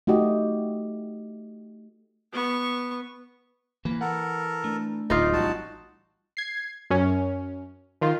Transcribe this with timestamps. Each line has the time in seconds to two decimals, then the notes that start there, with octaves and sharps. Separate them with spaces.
0.07 A3 D#4 F#4 G4 D#5
2.33 B3 C#6
3.85 E3 A#3 B4
4.01 A4 A#4 F#5
4.64 A3 D4
5.10 D1 D2 D#4 F4 D5
5.33 A1 G3 F#4 A5
6.37 G#6 C7
6.90 F#2 C#4
8.01 D#3 F4